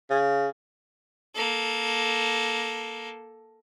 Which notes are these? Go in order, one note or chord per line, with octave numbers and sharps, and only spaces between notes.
C#3
A#3 A4